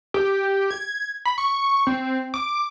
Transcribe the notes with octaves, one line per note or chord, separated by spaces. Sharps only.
G4
G#6
B5
C#6
C4
D6